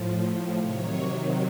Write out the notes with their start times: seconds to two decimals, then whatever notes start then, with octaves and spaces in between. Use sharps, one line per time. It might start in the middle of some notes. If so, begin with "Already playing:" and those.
Already playing: A2 F3
0.58 C3 D#3 F#3 C#5